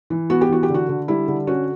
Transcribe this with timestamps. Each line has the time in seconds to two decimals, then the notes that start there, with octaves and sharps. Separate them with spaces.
0.10 E3
0.30 B3 F#4
0.41 G4
0.49 E3 F#4
0.63 G4
0.69 D3 F#4
0.89 D3
1.08 G3 E4
1.28 D3
1.47 C#4 F#4